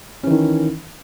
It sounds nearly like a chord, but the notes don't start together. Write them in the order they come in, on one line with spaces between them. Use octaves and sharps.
C#4 E3 D#3